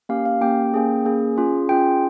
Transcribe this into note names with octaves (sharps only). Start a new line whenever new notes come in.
A#3 C#4 G4 F5
F5
A#3 C#4 G4 G5
A#3 C#4 G#4
A#3 C#4 G#4
C#4 F4 G#4
C#4 F4 G#4 G5